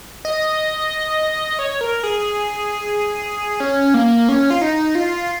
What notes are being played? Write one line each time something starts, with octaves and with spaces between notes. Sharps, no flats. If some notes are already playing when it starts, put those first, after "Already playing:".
D#5
C#5
A#4
G#4
C#4
A#3
C#4
F4
D#4
F4